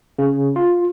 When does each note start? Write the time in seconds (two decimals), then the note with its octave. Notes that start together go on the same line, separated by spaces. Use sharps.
0.19 C#3
0.56 F4